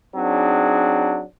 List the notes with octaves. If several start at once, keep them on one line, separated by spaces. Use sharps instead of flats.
F#3 C4 D4 D#4 G#4